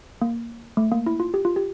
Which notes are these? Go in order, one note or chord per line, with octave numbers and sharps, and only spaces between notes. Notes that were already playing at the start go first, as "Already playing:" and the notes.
A#3
A3
A#3
E4
F4
G4
F4
G4